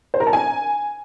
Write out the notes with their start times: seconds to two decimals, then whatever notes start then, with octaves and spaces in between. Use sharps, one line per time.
0.14 C5
0.20 A#4
0.27 A5
0.33 G#5